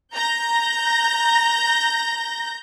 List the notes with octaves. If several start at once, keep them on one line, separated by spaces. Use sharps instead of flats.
A#5 G6 A#6